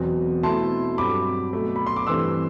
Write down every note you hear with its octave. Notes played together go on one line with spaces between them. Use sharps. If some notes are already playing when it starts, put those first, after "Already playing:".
Already playing: E2 B2 F#3 C4
B2 A3 C4 E4 A5 C6
G2 F#3 C4 B5 D6
B2 F#3 A3
B5
C6
D6
G2 E3 A3 C4 C6 E6